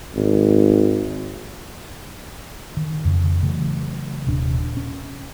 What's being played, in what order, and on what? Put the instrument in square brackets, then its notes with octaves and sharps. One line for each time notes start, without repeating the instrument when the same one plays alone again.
[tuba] G#1
[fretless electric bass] D#3
F2 C#3
C#3 E3 F#3 A3
D#1 C3 D4
C#4